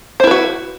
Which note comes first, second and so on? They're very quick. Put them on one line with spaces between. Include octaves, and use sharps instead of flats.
C5 E4 B4 F#4